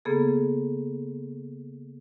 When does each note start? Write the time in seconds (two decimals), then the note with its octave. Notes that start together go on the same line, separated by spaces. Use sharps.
0.05 C#3 A#3 B3 G#4 A4